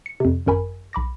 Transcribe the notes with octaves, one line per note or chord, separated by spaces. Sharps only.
C#7
F2 C3
G#1 F#2 A#4 G#5 B5
B1 B5 D6 A#6